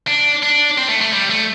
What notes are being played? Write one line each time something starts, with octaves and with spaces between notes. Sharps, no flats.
D4
D4
C4
A3
A3
G3
A3